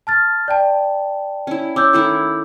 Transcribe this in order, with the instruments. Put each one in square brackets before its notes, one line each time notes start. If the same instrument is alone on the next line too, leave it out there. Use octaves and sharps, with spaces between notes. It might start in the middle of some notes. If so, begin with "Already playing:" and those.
[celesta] A5 F6 A6
D5 G5 A5
[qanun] C#4 E4
[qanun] C#4 [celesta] D6 E6 G6
[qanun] D#3 A3 E4